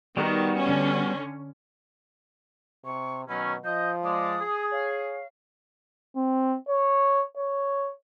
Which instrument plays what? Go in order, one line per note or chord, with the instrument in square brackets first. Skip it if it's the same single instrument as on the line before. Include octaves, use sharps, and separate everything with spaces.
[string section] D#3 [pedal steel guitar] G3 B3 F#4
[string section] D3 C#4
[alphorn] C3 [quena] C#6
[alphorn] B2 [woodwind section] D#3 F#3 C#4 [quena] B5
[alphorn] F3 [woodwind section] D#5 [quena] G6
[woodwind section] G#3 D5 [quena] D#6
[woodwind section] G#4
[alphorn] C#5 [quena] F5
[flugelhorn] C4
C#5
C#5